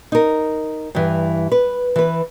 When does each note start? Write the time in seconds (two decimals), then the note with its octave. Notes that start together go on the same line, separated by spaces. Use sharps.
0.12 D#4 A#4
0.95 G2 E3
1.52 B4
1.96 E3 B4